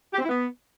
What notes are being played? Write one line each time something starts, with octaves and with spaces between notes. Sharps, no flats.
G4
C4
E4
B3